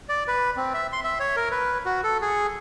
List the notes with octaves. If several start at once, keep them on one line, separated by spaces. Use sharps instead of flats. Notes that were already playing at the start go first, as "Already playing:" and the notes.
D5
B4
C4
E5
C6
E5
C#5
A#4
B4
F#4
A4
G#4